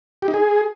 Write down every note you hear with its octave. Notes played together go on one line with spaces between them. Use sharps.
G4
D#4
G#4